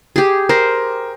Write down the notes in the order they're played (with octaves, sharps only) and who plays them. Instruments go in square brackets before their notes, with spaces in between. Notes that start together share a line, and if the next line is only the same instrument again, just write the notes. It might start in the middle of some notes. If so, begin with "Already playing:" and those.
[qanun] G4 G#4
[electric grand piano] A#4 A#6 [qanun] C5